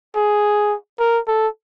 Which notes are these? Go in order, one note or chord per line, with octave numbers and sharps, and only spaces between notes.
G#4
A#4
A4